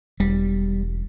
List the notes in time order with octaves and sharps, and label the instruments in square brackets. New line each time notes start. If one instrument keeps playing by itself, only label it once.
[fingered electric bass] E1 [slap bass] G3